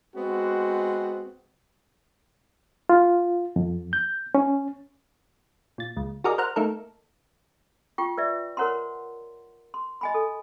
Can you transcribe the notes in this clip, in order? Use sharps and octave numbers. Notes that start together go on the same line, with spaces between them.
G#3 B3 C4 F#4
F4
F2
G6
C#4
A#2 A6
C#2
F#4 G#4 A#4 D5 D#5
A#4 C5 F#5 A#5 F6
A3 A#3 D#4 A4 A#4
F4 G5 C#6
B4 D5 E5
A#4 C5 C#5 F#5 A#5 C6
C6
D#5 G#5 B5
A4